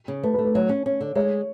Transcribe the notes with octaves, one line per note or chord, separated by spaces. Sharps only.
C#3
A3 B4
B4
A3
B4
F#3 C#5
C#4
C#4
D3
G#3 C#5